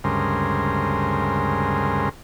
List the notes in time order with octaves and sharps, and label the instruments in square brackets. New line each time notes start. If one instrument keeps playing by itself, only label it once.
[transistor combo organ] D2 G2 C#3 G#3 A#4 C5